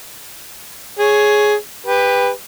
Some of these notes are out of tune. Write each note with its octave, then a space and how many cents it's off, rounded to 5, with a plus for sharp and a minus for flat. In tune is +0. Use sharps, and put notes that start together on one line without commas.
G#4 +10 C#5 +0
G4 +25 B4 +0